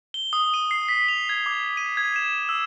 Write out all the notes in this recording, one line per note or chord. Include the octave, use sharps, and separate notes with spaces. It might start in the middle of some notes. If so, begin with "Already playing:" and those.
G7
D#6
D#7
C7
B6
F7
G#6
D6
D#7
G#6
E7
E6